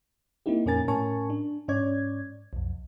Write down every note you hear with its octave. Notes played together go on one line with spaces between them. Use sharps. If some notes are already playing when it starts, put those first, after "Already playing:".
A#3 C4 D#4 E4 G4
F2 A#2 C#4 A#4 G#5 A6
A2 C#4 A#4 G#5 A5 C#6
D4
G#2 C#4 C#5 D5 G#6
B1 F2